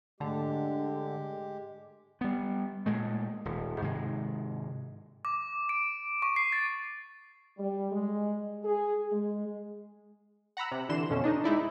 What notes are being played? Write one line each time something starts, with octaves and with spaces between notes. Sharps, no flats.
G#2 D3 G#3 A3 D4 G4
G3 B3
A#2 G#3 A3
D#1
G#2 C3 D#3 G#3
D6
D7
C#6
C7
A6
G3
G#3
G#4
G#3
F#5 A#5 B5 E6
C3
D3 E3 C6 E7
F2 B2 D3 C#4
D4 D#4 D#5
G#3 D#4 E4 D5